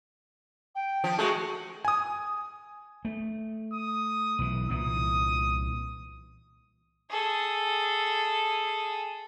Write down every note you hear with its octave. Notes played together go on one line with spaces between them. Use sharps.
G5
F3
G#3 A3 F#4
G#5 D#6
A3
D#6
B1 E3
C2 A#2 E3 D#6
G#4 A4